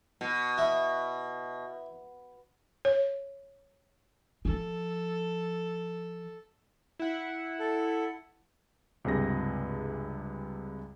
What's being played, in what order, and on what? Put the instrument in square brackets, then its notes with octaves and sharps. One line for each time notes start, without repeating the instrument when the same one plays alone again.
[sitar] B2
[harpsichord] E4
[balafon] C#5
[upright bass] F3 [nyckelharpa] A4
[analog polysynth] E4 F#5
[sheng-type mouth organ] A4
[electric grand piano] C#2 G2 C3 G#4 A#6